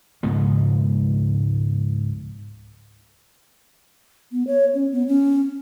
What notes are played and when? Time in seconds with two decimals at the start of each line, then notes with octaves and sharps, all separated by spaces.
0.23 C#2 G#2 B2 F3
4.32 B3
4.47 C#5
4.74 C#4
4.92 B3
5.08 C#4